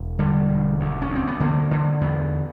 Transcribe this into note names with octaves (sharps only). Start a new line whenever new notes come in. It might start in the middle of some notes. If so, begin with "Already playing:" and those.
Already playing: E1
D3 G3
E1
D2
C#4
D2
C4
B3
D3 A#3
D3
E2 B3